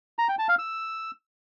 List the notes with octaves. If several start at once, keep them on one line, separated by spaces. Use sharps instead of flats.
A#5
G5
A5
F5
E6